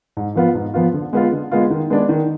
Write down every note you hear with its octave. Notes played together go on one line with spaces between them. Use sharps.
G#2
F3 B3 F4
G#2
F3 B3 F4
D3
G#3 B3 F4
D3
G#3 B3 F4
D#3
G#3 B3 D4
D#3